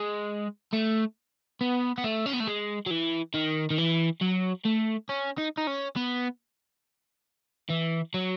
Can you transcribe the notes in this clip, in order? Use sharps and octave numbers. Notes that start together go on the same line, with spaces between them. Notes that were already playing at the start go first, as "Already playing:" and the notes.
Already playing: G#3
A3
B3
B3
A3
C#4
B3
A3
G#3
F#3
E3
D#3
D#3
E3
F#3
A3
C#4
D#4
D#4
C#4
B3
E3
F#3